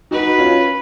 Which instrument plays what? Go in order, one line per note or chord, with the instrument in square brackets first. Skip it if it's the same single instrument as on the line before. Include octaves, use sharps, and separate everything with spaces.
[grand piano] D#4 F#4 [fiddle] B4
[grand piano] C#4 F4